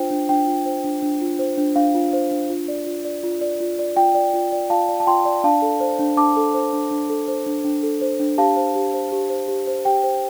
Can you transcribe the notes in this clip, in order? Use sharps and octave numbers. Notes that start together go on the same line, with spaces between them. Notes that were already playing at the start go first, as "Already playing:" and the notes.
Already playing: D4 F4 C5 G5
D4
D4 G5
F4
C5
D4
D4
F4
C5
D4
D4 F5
F4
C5
D4
F4
D5
F4
D5
F4
D5
F4
D5
F4 G5
D5
F4
D5
F4 F5 A5
D5
A5
F4 G5 C6
D5
D4 F5 A5
A4
C5
D4
D4 A5 D6
A4
C5
D4
D4
A4
C5
D4
D4
A4
C5
D4
G4 F5 A5
C5
G4
C5
G4
C5
G4
C5
G4 G5
C5